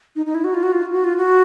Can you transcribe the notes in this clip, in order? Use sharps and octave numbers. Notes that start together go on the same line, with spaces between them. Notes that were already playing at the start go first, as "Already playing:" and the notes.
D#4
D#4
E4
F#4
F4
F#4
F4
F#4
F4
F#4